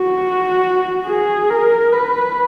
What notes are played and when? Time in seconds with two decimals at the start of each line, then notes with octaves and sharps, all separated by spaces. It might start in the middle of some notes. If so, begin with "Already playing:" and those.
Already playing: F#4
1.06 G#4
1.50 A#4
1.92 B4